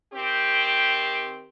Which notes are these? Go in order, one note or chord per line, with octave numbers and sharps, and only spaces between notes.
D#3 C4 G4